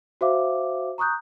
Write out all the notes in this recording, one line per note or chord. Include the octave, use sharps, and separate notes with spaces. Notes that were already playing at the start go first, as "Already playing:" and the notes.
F#4 C5 E5 F5 D6
A#5 C#6 D#6 F#6 G6